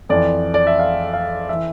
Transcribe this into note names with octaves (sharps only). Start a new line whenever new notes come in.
F2 E3 D5
D5
E5
F5
F5
E3 E5